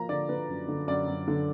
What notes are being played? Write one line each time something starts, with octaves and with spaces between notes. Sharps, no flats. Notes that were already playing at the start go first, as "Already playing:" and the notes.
Already playing: F3 A#3 A#5
D3 D5
D3 B4
F#2
D3
F#2 D5
F#2
D3